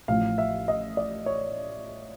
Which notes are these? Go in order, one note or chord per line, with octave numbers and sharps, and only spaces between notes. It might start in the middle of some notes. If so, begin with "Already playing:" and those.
A1 A2 F3 F5
E5
D#5
D5
C#5